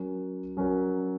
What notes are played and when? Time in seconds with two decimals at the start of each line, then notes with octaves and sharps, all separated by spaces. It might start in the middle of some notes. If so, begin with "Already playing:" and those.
Already playing: F#3 C#4 F#4 A#4
0.57 F#3 C#4 F#4 A#4